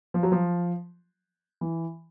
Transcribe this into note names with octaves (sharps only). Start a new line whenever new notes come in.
F3
F#3
F3
E3